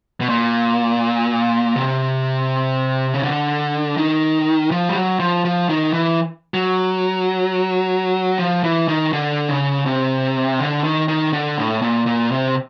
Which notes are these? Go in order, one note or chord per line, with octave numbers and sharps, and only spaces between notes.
B2
A#2
C3
C#3
D3
D#3
F3
G3
F#3
F3
F3
D#3
E3
F#3
F3
E3
D#3
D3
C#3
C3
D3
D#3
D#3
D3
A2
A#2
A#2
C3